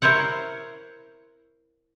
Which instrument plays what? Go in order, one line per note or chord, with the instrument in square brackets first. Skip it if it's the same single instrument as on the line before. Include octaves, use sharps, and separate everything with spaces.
[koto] E4 A#4 C5 C#5 F#5